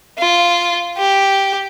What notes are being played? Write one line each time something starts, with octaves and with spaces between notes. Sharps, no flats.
F4
G4